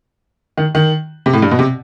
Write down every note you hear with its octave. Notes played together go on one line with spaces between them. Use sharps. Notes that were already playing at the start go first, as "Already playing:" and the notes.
D#3
D#3
C3
A2
G2
B2
C3